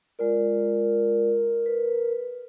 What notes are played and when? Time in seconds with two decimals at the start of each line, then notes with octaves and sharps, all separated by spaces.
0.19 G#3 F4 A#4 D5
1.66 B4